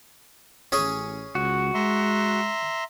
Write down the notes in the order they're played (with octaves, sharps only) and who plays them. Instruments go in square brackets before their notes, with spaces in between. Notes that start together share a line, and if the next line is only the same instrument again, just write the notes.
[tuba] A1 [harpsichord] C#4 G#4 C#6
[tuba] C#2 [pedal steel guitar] F#4
[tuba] G#3 [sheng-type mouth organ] E5 A#5 C6